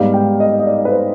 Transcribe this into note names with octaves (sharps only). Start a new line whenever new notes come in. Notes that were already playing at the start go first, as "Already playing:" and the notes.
Already playing: G#2 G3 B3 D#4 F5
G5
D#5
D#5
D5
B4
C5